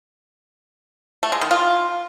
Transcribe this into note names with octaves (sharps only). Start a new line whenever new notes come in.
A3
G#3
D#3
F4